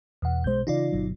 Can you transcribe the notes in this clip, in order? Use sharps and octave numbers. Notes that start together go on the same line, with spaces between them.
E2 B2 F#5
B1 B2 G#3 C5 G6
C#3 E3 D#4 F4 D5
G1 B2 F#3